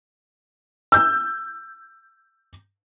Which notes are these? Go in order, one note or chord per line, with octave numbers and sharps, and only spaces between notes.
E6 G6